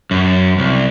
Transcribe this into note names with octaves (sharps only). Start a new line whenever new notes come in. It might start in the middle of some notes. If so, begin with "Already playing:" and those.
F#2
C2